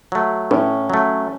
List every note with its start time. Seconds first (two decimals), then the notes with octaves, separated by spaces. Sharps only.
0.12 F#3 A3
0.51 A2 C#4
0.90 F#3 A3